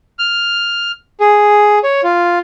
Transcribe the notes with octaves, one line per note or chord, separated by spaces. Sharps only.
F6
G#4
C#5
F4